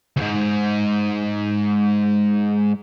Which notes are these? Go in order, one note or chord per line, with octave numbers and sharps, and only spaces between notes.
D2 G#2